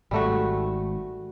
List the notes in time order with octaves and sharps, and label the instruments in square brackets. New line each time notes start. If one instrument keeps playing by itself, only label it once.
[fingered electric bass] G#1 G#2 [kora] G3 A3 F#4